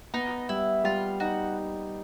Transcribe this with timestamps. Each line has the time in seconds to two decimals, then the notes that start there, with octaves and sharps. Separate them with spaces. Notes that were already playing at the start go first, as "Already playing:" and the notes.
0.14 B3 D#4
0.49 G3 E4
0.84 G3 F4
1.20 D#4 F#4